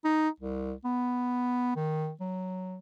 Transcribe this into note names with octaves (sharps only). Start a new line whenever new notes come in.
D#4
C2
B3
D#3
F#3